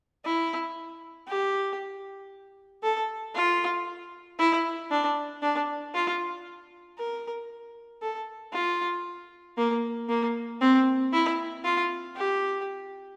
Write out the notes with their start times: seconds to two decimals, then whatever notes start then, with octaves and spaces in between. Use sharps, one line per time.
0.25 E4
1.28 G4
2.83 A4
3.35 F4
4.39 E4
4.91 D4
5.42 D4
5.94 F4
6.98 A#4
8.02 A4
8.53 F4
9.58 A#3
10.09 A#3
10.61 C4
11.13 E4
11.64 F4
12.16 G4